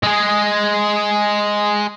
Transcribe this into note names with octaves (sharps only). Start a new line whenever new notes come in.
G#3 G#4